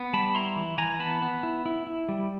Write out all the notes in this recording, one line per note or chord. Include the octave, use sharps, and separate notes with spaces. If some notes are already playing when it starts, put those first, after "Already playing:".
Already playing: B3
G3 A5 B5
E4 A#5 C6
E3
E3 G#5 A#5
B3 A5 B5
B3
E4
E4
E4
G3